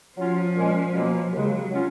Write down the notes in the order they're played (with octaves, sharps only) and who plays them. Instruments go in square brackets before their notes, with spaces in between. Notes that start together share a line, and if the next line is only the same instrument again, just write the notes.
[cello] F3 [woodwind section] F#3 C#4 F4
[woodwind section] A#2 G#3 C#4
B2 F#3 A#3
[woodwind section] D#2 C#3 G#3 [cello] F#3
[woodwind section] F#3 C#4 F4